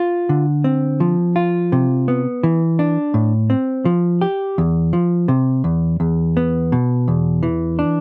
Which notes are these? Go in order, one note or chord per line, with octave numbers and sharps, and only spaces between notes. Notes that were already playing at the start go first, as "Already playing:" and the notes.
Already playing: F4
D3
C4
F3
F4
C3
B3
E3
D4
A2
C4
F3
G4
E2
F3
C3
E2
E2
B3
B2
E2
E3
D4